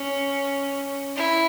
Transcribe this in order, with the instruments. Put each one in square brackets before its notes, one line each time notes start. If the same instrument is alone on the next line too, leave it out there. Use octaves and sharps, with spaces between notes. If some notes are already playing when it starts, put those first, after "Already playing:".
Already playing: [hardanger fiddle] C#4
E4